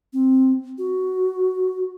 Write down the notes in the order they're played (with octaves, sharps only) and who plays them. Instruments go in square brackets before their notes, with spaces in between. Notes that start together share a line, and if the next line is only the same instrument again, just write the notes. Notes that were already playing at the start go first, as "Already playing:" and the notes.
[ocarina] C4
F#4